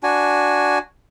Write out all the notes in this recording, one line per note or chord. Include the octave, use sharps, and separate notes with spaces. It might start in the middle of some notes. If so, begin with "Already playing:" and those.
D4 F#4 G#5